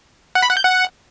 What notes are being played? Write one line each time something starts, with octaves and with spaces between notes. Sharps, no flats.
F#5
B5
F#5
G6
F#5